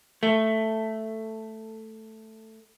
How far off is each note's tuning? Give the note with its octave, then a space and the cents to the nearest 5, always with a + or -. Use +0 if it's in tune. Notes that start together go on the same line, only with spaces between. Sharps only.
A3 +5